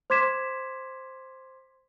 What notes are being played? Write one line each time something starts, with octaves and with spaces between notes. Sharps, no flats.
C5 C6 D6 G#6 B6 E7